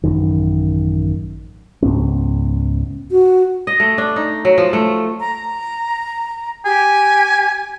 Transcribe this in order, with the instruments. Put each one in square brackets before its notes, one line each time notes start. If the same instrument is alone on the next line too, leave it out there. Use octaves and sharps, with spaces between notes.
[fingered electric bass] A1 F#2 D#3
C#2 G#2 B3 C#4
[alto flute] F#4
[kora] D#5
A3
D4
D#4
F#3
F3
A3
[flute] A#5
[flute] G4 [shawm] G#5